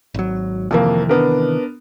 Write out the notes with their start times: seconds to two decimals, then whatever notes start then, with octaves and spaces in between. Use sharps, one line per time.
0.14 G#1 F#3
0.71 F2 C3 D#3 E3 A#3
1.09 B3 D4 A#4